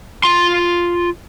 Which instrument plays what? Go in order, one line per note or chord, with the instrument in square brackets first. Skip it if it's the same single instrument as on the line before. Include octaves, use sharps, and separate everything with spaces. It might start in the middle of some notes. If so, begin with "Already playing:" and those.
[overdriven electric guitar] F4 C6